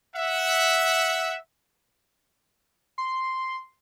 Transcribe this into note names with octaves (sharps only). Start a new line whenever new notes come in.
E5 F#5
C6